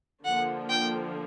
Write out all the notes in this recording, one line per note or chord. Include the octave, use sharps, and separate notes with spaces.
D3 F3 A#3 F#5
G5